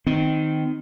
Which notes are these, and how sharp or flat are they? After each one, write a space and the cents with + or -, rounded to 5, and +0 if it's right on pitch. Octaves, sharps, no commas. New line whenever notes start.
D#3 +0 C4 -25